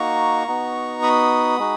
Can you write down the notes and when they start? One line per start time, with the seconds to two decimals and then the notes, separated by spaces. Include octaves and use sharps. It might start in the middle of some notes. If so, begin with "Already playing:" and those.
Already playing: A#3 D#4 F#4 A#5 C#6
0.48 B3 D#4 F#4
1.03 B5 D#6
1.59 G#3 D#4 F#4